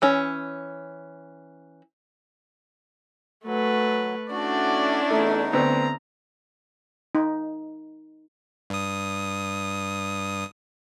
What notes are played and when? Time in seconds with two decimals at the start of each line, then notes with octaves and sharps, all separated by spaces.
0.02 E3 C#4
3.45 F#3 A3 B4
4.31 A3 C#4 D4 E4 F#4 D5
5.11 E2 A3 D#4
5.53 D2 B3 C4 A#5
7.15 D#4
8.70 G2 D#6